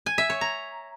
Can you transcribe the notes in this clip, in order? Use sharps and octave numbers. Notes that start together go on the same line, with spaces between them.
G#5
E5
C#5
A#5